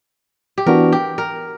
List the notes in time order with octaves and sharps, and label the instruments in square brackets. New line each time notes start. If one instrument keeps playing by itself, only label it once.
[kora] G4
[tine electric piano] E3 B3 D4 F#4 [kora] A#4
[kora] G4
A#4